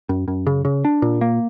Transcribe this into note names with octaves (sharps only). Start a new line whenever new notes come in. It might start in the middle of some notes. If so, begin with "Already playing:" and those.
F#2
F#2
C#3
C#3
D4
A#2
A#3